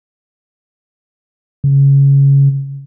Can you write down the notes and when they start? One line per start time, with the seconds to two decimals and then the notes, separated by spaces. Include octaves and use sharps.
1.64 C#3